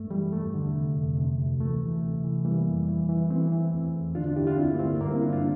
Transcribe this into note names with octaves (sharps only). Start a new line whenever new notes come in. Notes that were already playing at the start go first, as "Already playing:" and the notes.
Already playing: G2 A3
E3 G3
E2 A3
D3
C3
F2
C3
D2
E3 A3
E3
C3
E3
E3 G3 A#3
F2
E3
E3
E3 A3 C4
E3
E2
E2
D3 D4 F4
D4 F4
G2 E4 G4
D4 F4
D2 C4 E4
A#3
D3 A3 C4
G2 G3 A#3
C4 E4
D3 D4 F4
D4 F4